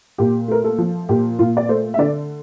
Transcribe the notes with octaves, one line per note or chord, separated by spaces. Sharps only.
A#2 G4
A3 A#4
A4
F3
A#2 G4
A#2 F4
D5
A3 C5
E5
D3 D5